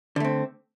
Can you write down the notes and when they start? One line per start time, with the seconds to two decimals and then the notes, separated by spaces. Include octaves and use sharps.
0.16 D3
0.20 A3
0.24 C4